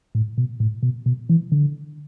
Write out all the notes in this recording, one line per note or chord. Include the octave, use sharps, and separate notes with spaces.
A2
B2
A2
B2
B2
E3
D3